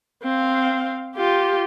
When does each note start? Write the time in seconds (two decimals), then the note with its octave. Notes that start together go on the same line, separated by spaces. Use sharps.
0.23 C4 F5
1.16 F4 G4